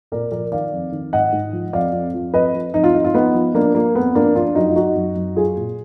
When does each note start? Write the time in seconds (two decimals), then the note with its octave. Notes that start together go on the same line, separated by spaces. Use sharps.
0.12 A#2 A#4 D5
0.32 F3 A#4 D5
0.52 D#3 D5 F5
0.72 F2
0.92 D#3
1.13 G#2 D#5 F#5
1.32 G#2
1.53 F3
1.73 F2 D5 F5
1.93 F2
2.14 F3
2.33 F2 B4 D#5
2.54 F3
2.74 F2 D#4
2.84 F4
2.94 F3 D#4
3.05 F4
3.14 F3 B3 D#4
3.34 F3
3.54 F3 A#3 D4
3.75 F3 A#3
3.95 F2 B3
4.15 F3 A#3 D4
4.35 F3 D4 F4
4.55 F#2 D#4 F#4
4.69 F4
4.76 F#2 D#4 F#4
4.95 F#2
5.16 F#2
5.36 F#3 F4 G#4
5.57 A#2